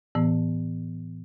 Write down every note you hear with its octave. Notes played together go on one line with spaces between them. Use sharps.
A2 E3 B3